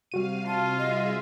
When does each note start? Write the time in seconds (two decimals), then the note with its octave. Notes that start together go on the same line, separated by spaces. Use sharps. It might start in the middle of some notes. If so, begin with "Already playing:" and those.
0.12 C3 G3 F#4 F5 D#7
0.47 F4 A5
0.78 G#4 D#5 E5